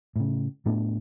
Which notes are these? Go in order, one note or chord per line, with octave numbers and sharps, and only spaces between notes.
A2 C#3
A2 A3 B3 D4